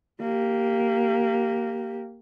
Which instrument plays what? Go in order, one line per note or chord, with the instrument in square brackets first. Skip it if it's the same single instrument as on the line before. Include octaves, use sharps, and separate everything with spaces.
[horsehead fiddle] A#3 G4